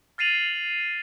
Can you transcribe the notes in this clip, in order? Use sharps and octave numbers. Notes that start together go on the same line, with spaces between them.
F6 A6 C7 D#7 F7 F#7